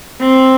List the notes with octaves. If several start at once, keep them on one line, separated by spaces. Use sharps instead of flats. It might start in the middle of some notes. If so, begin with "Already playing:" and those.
C4